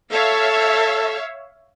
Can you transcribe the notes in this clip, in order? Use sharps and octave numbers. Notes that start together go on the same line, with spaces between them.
A4 C#5 E5 F5